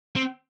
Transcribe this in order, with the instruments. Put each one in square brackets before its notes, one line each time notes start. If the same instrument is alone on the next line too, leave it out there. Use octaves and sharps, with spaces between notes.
[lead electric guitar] C4